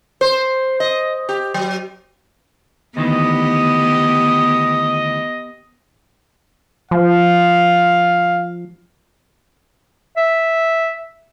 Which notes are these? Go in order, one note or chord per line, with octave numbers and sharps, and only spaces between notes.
C5
D#5
G4
F#3
D2 D#3 E3 B3 G4 D#5
F3 F5
E5